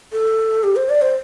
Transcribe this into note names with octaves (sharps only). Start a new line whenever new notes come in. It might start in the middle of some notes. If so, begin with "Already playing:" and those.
A4
G4
C5
D5
C5